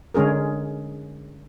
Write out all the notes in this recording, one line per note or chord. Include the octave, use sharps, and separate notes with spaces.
D3 G#3 C#4 G#4 A#4